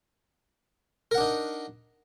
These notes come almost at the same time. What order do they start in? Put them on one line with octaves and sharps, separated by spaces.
A#4 F#5 D4 D#4